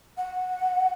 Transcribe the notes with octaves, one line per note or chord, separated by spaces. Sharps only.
F#5